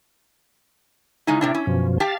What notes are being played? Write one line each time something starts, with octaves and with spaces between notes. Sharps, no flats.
C#3 G#3 D#4 E4
A2 C3 D4
C#4
F#2 B2 F3
G4 F5 G5 A5 A6